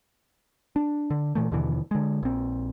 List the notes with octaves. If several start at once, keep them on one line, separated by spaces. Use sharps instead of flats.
D4
D3
A#2 E3 A3
D#2 B2 D3 E3
D3 G#3
A#1 C4